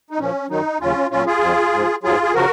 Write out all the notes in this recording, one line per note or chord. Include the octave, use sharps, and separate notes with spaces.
D#4
A#2 F3 C#4
F#2 D#3 F#3 D#4
D#2 C#3 F#3 C#4 F4
A#2 F#3 C#4 F4
F4 G#4
F2 F3
G#2 F3
G#2 F#3 F4 G#4
G#4
C#3 F3 F#4 A#4